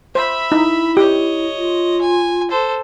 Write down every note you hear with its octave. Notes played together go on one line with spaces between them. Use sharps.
C5 E5 B5
D#4 E4
G4 C#5 D#5
F4
G#5
A4 C5